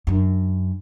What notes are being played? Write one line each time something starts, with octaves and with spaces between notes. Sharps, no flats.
F#2 D4